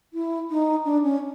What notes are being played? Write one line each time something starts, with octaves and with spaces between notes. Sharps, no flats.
E4
D#4
D4
C#4